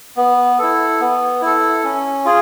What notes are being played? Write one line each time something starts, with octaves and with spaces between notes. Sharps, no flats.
B3
E4 A4
B3
E4 A4
C#4
F4 G#4